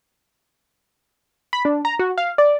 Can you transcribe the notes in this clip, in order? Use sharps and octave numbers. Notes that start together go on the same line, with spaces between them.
B5
D4
A#5
F#4
F5
D5